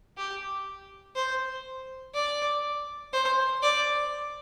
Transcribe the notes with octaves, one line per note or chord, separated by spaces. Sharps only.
G4
C5
D5
C5
D5